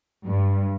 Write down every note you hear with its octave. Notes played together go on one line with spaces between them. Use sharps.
G2